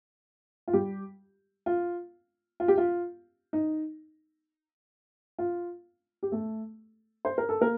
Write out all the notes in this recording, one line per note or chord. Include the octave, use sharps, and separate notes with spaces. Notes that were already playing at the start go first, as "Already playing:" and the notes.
F4
G3 G4
F4
F4
G4
F4
D#4
F4
G4
A3 A4
C5
A#4
A4
A#3 A#4